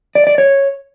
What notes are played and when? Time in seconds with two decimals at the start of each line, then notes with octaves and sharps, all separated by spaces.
0.15 D5
0.27 D5
0.38 C#5